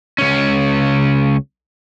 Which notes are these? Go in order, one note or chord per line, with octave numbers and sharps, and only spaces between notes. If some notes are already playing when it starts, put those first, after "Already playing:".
C#2 C#4